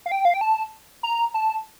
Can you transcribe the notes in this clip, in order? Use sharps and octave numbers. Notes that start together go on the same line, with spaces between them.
F5
G5
F5
G5
A5
A#5
A5